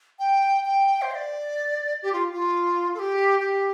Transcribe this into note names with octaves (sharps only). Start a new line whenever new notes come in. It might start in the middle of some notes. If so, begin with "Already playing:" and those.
G5
G5
C5
F5
D5
G4
F4
F4
A4
G4
G4